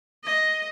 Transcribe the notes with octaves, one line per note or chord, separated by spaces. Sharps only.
D#5